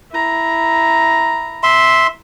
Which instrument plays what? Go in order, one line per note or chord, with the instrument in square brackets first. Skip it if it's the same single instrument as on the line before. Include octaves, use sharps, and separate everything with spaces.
[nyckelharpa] E4 A#5
[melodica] E5 C6